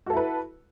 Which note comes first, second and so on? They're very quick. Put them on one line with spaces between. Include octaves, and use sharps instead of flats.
F#4 A4 E4 B4